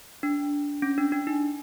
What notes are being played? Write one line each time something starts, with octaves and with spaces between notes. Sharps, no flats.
D4
C#4
D4
D4
D#4